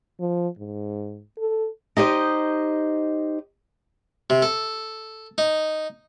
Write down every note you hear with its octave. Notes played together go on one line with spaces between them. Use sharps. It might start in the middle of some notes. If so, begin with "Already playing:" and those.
F3
G#2
A4
D#4 G4 C5 D#5
C3
A4
D#4